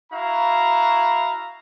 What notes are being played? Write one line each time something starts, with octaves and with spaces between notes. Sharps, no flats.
E4 F#4 F5 A#5